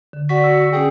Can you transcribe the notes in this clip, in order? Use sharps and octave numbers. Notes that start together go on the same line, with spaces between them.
D3
F#4 D5 F#5 C#6 B6
E6 C#7
C#4 G#4 G5